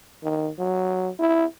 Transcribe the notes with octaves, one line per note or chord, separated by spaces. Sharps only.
D#3
F#3
E4